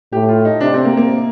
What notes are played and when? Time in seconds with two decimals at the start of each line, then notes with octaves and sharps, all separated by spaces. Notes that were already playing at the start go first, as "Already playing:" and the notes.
0.12 A2 G4
0.29 F4
0.45 D#4
0.60 C3 D4
0.74 C4
0.85 A#3
0.97 A#3